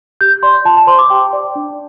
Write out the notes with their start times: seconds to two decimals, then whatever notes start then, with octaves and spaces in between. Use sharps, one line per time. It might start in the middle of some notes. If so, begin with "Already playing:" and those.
0.21 G4 G6
0.43 D5 C6
0.65 F4 A5
0.77 A5
0.87 C5 C6
0.98 D6
1.10 G4 G5
1.33 D5
1.55 D4